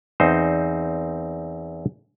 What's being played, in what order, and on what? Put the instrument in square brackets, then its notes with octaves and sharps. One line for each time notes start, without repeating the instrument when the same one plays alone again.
[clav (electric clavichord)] E2 C4 D#4 C5